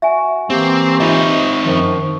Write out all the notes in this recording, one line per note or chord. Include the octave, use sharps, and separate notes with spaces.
F#4 E5 G#5
E3 A#3 C4 G4
C4 D#4 F4 C5 C#5 D#5 E5
F#2 D#3 F3 A#4 C#6